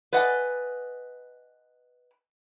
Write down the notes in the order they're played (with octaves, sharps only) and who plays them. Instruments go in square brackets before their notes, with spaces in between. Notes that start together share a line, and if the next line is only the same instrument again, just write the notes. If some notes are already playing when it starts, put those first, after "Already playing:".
[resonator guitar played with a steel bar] B4 D5 D#5 F#5 G#5